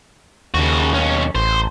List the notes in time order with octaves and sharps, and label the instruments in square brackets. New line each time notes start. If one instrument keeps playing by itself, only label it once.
[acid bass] D#2 [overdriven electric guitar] C#3 F#4
[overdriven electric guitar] B1 C#4
[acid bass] A1 [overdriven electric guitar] C5